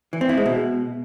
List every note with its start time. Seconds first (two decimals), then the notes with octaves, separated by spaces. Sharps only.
0.13 E3
0.21 C4
0.29 E4
0.37 G#3
0.46 B2